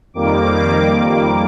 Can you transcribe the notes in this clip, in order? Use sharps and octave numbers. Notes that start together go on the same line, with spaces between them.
F2 D#3 G3 A#3 D6